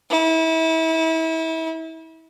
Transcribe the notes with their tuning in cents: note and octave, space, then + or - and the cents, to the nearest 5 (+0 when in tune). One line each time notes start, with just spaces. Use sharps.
E4 -30